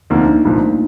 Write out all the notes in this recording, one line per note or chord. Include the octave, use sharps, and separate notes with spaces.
D2 C3 F3 A#3 D#4
D4
A#3
C2 A#2 F3 A3